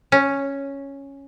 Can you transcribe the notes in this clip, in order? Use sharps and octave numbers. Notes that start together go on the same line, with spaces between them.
C#4